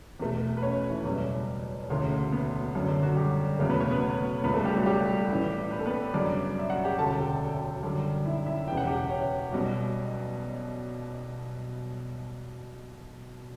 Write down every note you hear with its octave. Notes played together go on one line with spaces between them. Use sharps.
E2 B2 A3
B4
C#4 C#5
E3 E4
F#1 E2 B2 G3 C#4
E1 D2 C#3 E3 A3
B3
F#1 F#2 D3 C#4
D3 D4
F#3 F#4
G3 G4
E1 E2 C#3 F#3 A3
B3 B4
C#4 C#5
B3 B4
C#2 C#3 G3 B3 B4
A3 A4
G3 G4
F#3 F#4
G3 G4
A1 A2 E3
B4
A4
B3 B4
F#2 C#3 G3 D4 D5
E5
F#4 F#5
G4 G5
E1 D2 C#3 A4 A5
G4 G5
F#2 D3 G3
E4 E5
E4 E5
E1 E2 C#3 E3 G5
F#5
G4 G5
C#4 C#5
B1 B2 G3